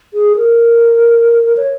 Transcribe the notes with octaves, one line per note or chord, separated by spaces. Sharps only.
G#4
A#4
C#5